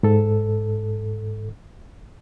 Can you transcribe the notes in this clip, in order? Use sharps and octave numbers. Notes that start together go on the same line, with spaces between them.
G#2 A4